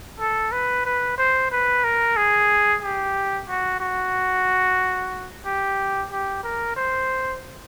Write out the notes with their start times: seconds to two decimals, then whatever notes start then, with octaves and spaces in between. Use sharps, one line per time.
0.20 A4
0.52 B4
0.85 B4
1.18 C5
1.51 B4
1.84 A#4
2.17 G#4
2.82 G4
3.49 F#4
3.80 F#4
5.45 G4
6.10 G4
6.44 A#4
6.77 C5